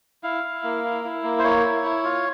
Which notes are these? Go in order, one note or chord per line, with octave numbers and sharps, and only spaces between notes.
E4 F5
E4
A#3
E4
E4
A#3
C5
A#3 C#5
E4
E4
F4